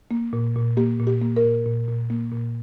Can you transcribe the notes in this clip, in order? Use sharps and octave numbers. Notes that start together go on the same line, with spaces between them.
A#3
A#2
A#2
A#3 G4
A#2
G4
A#3
A#4
A#2
A#2
A#2
A#3
A#2